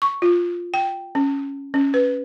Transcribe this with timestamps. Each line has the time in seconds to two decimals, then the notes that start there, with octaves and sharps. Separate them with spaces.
0.02 C#6
0.22 F4
0.74 G5
1.15 C#4
1.74 C#4
1.94 B4